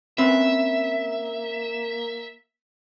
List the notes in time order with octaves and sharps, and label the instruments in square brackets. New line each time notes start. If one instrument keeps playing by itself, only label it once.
[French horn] A#3 [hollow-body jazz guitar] C4 C#4 B4 [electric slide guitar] E5